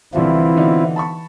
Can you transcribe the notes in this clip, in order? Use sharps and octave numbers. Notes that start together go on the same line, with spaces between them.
C2 D3 E3 F3 C4 E4 F4
B2 D3 D#4
A5 B5 C#6